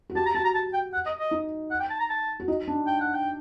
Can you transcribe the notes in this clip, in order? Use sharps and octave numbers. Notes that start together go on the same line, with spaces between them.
F#4
G4 A5
A#5
F#4 A5
A#5
A5
G5
F#5
D#5
D#5
D#4
F#5
G5
A5
A#5
A5
F#4
D#4
D4
G5
F#5
G5